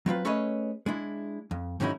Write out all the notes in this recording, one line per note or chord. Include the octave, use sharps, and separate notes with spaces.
F#3 C4 F4 B4
A3 C#4 G#4 B4 C#5 D#5
G#3 D4 E4
F2
G#2 D#3 F#3 C#4 D#4 E4